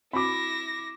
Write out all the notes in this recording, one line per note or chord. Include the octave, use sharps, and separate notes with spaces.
C4 E4 F#4 B5 D6 A#6